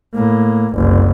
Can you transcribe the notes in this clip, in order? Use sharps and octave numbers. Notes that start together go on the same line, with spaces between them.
A2 A#3
F#1 C2